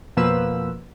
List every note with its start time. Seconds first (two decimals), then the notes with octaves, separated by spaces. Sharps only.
0.17 F2 B2 F3 A#3 B4 E6